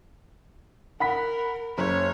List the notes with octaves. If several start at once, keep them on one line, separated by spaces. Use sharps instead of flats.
A#4 F#5 B5 B6
F#1 C#5